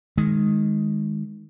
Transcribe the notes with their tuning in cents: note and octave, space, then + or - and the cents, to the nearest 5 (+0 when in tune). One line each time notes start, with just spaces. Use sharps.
D#3 +0 G#3 +0